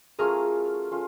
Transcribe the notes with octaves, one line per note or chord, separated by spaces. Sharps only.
F#3 A3 C#4 F4 G#4 A#4
C#4 F4 A4